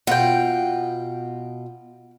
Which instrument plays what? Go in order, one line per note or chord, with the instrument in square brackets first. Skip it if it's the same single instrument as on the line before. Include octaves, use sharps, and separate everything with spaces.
[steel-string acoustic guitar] B2 F4 [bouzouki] F#5 G5